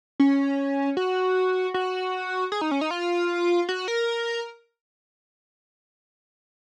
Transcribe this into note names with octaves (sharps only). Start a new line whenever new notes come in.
C#4
F#4
F#4
G#4
D#4
C#4
D#4
F4
F#4
A#4